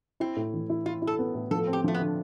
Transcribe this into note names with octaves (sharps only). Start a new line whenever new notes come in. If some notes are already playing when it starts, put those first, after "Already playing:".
C4 E4
A2
E3
E4
E4 F4
E4
A4
B3
A2
F3 A4
C4
G4
F3 A3
B3
D3